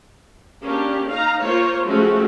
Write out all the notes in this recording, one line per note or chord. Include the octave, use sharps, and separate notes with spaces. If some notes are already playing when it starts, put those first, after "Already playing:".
A#3 C#4 D4 G4
D#4 F5 A#5
A#3 F4 C5 C#5
F3 G#3 A3 C4 C#4 F#4